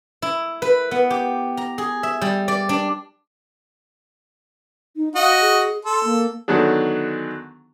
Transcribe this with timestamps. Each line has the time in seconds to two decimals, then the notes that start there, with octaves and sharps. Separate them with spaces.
0.22 E4
0.62 B4
0.91 B3
1.10 G4
1.57 A#5
1.78 G#4
2.03 E5
2.21 G3
2.48 D5
2.69 D4
4.96 D#4
5.16 F#4 D#5 F5
5.42 G#4
5.85 A4 C6
6.04 A#3
6.48 D3 D#3 F#3 B3 D4 G#4